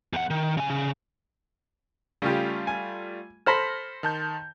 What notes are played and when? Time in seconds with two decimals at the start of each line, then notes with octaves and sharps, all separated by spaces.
0.13 E2 F#5
0.30 D#3
0.57 C#3 G#5
0.70 C#3
2.22 C#3 G3 A3 F4 G4
2.67 G#5
3.46 A4 C5 B5 F6 A#6 B6
4.03 D#3 A5 G6